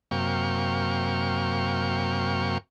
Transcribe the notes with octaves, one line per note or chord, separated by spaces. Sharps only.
F#2 C3 A#3 F5 G5 C#6